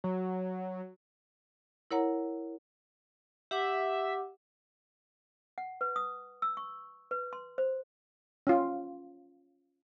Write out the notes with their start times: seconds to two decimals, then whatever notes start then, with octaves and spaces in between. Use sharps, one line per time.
0.04 F#3
1.91 E4 A#4 C#5 F#5 A#5
3.51 G4 E5 F#5 D6
5.58 F#5
5.81 B4
5.96 D#6
6.42 E6
6.57 C#6
7.11 B4
7.33 C6
7.58 C5
8.47 C#4 F4